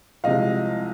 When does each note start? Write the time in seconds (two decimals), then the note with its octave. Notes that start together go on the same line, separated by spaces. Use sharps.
0.24 C2 C3 F3 G#3 D#5 F5